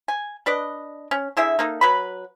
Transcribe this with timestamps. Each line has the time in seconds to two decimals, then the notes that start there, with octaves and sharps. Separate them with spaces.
0.08 G#5
0.46 D4 B4 D5 D#5
1.11 C#4
1.37 D3 E4 G#4 E5
1.59 A#3 D#4 A4
1.81 F#3 B4 B5